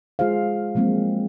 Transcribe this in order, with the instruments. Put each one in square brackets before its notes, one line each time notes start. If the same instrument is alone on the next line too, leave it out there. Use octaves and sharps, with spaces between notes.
[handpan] G#3 F4 G#4 C5 F5
F3 F#3 G#3 A#3 C4